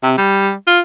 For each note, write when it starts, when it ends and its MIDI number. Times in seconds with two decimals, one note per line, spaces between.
0.03 0.14 48
0.17 0.53 55
0.67 0.80 65